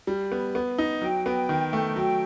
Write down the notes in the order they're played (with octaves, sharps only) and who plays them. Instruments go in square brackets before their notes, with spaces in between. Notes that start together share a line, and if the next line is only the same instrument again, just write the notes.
[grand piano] G3
B3
B3
D#4
[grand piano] F#3 [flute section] G5
[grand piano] B3
D#3
A3
[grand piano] F#3 [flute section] G5